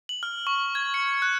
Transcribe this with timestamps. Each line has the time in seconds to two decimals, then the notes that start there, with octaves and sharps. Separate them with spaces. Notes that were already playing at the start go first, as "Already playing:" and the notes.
0.09 F#7
0.23 F6
0.47 C#6
0.75 G#6
0.94 C#7
1.22 F#6